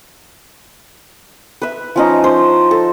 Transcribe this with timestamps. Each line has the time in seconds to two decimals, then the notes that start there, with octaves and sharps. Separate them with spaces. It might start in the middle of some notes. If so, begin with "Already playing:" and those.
1.62 B4 E5
1.96 F3 C#4 D#4
2.24 C5
2.71 A4